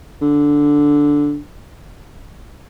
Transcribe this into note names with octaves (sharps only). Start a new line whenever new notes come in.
D3